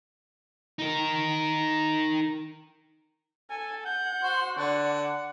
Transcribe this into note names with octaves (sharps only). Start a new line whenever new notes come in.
D#4 A#4
A4 G#5
F#5 G6
F#4 C5 C6
D3 D5 F#5
F#5